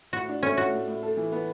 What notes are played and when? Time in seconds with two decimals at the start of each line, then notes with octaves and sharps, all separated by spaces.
0.13 A2 F#4
0.29 D4
0.43 A3 C#4
0.57 A2 F#4
0.73 A2
0.88 A2
1.03 A4
1.17 E3
1.32 B3